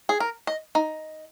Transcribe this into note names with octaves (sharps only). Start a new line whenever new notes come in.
G#4
A#4
D#5
D#4